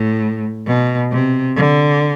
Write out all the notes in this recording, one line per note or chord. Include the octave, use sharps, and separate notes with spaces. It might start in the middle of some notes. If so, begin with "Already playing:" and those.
Already playing: A2
B2
C3
D3